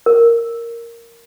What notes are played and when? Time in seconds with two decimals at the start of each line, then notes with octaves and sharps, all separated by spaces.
0.06 A#4